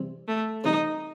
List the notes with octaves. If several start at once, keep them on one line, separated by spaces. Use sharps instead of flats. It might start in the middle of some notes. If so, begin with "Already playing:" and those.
Already playing: C3 E3 G3
A3
C3 E3 G3 D#4